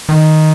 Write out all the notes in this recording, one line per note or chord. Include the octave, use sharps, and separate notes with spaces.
D#3